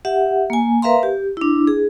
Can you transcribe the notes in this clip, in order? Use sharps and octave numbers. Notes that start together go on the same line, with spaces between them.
G4 E5 F#5
A#3 G#5
A#4 B4 E5 F5 A#5 C6
G4
D4 E4
G#4